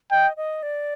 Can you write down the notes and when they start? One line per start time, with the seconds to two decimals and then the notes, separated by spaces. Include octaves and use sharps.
0.11 D#5 G5
0.37 D#5
0.63 D5